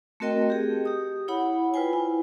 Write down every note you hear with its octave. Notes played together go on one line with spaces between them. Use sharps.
A3 C4 F#4 A#4 D#5 G5
G4 G#4
G4 D#6
E4 C#5 F#5 B5
F4 B4 C5 G5 G#5
E4